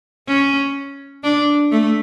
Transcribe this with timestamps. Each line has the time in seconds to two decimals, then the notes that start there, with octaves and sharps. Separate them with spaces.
0.27 C#4
1.23 D4
1.72 A3